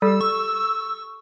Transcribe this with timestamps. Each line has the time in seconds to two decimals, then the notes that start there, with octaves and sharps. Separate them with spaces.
0.02 G3 G4 A4 E6
0.21 C#6